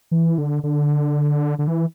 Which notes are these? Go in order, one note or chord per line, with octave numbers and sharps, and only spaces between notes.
E3
D3
D3
D3
E3